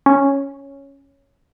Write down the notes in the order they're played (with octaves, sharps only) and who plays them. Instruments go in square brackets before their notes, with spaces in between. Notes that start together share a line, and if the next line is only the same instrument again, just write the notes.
[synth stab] C#4